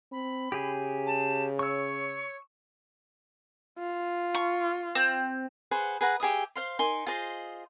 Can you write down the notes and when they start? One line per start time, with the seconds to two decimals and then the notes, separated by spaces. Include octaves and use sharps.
0.12 C4 B5
0.52 C#3 G4 G#4
1.06 A5
1.59 C#5 C#6 E6
3.79 F4
4.35 C#6
4.95 C4
5.71 G#4 B4 C5 F#5
6.01 G#4 B4 F#5 A#5
6.20 G4 G#4 E5 D#6
6.56 C5 F5 C6
6.79 D#4 A#4 G#5 C6
7.06 F4 G#4 C5 D#5